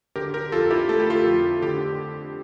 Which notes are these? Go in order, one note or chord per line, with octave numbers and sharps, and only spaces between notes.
D3 G4 A#4
G4 A#4
F2 F4 A4
E4 G4
A3 A4
G4
F4 A4
F2
D3 G4